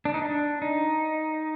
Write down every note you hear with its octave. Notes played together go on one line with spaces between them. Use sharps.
D4
D#4
D4
D#4